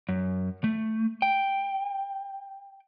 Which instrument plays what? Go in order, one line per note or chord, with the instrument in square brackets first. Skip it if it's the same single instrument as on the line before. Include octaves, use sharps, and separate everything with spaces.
[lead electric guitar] F#2
A3
G5